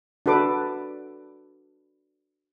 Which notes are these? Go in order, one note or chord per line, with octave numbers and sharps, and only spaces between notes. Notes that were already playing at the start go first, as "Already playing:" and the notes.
D4 F#4 A4 B4 D6